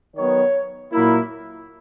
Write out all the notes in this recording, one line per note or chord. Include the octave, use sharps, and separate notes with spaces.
D#3 F#3 B3 C#5
A#2 F#3 A#3 E4